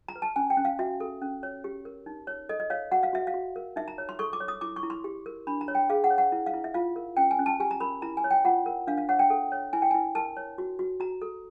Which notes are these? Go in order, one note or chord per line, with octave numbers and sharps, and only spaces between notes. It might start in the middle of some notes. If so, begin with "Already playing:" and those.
A#5
B4
A5
C#4 G#5
G5
C#4
F5
F#4 E5
A4
C#4
C#5
G4
A#4
D#4
C#5
A4 D#5
D#5
C#5 F5
F#4 F#5
F5
F#4 E5
F5
F#4
A#4
D#4 E5
A#5
C#5
C6
A4 C#6
D6
C#5
D#6
E4 D6
C#6
E4
C6
G4
A#4
D4 B5
A#5
C#5
G5
G#4 F5
F#5
C#5
F#5
E4
F5
E4
E5
F4 F5
A#4
C#4 G5
G#5
C#4
A5
G4 G#5
A#5
A#4 B5
E4 A#5
G#5
C#5
G5
F4 F#5
A#4
D4 F5
F5
C#5 F#5
G5
A4
C#5
E4 G#5
G5
G#5
E4
A#4 A5
C#5
F#4
F#4
F#4 A#5
A4